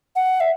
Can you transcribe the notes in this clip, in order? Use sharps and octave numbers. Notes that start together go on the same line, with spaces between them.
F#5
E5